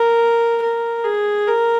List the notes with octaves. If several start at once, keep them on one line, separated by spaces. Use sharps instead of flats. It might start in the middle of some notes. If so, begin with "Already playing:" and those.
Already playing: A#4
A#4
G#4
A#4